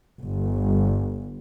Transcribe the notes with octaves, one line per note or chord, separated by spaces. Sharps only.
G1